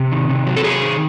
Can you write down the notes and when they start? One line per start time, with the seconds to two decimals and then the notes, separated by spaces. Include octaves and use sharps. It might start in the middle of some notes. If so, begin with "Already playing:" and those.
Already playing: C3
0.12 D#3
0.29 C3
0.46 F#3
0.57 A4
0.64 C3 G#4
0.82 D#3